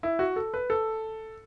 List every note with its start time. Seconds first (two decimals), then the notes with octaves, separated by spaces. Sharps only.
0.03 E4
0.19 F#4
0.36 A4
0.54 B4
0.70 A4